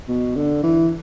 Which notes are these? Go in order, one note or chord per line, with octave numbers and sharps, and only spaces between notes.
B2
D3
E3